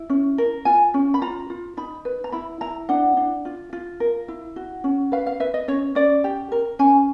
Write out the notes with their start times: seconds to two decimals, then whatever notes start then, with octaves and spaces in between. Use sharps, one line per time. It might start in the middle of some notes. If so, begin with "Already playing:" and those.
Already playing: E4
0.10 C#4
0.38 A#4
0.65 F4 G#5
0.94 C#4
1.14 B5
1.22 F4 A#5
1.50 F4
1.77 D#4 B5
2.05 B4
2.24 A#5
2.32 E4 B5
2.61 E4 A#5
2.89 D4 F#5
3.17 D4
3.45 F4
3.73 F4
4.00 A#4
4.28 E4
4.56 F#4
4.84 C#4
5.12 B4 F5
5.26 F5
5.40 B4 E5
5.54 D#5
5.68 C#4 C#5
5.95 C#4 D5
6.24 G4
6.52 A#4
6.79 C#4 G#5